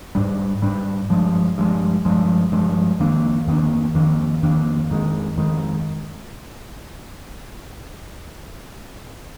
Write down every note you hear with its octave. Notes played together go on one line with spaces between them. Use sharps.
G#2 G3 D4
G#2 G3 D4
G2 F3 G#3
G2 F3 G#3
G2 F3 G#3
G2 F3 G#3
F2 D#3 A#3 D4
F2 D#3 A#3 D4
F2 D#3 A#3 D4
F2 D#3 A#3 D4
F2 D#3 G#3
F2 D#3 G#3